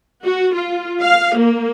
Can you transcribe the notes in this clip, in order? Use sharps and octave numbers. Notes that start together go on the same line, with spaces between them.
F#4
F4
F5
A#3